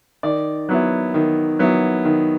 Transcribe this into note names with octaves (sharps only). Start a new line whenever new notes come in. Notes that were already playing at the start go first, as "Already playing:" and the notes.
D#3 D5
F#3 B3 E4
D#3
F#3 B3 E4
D#3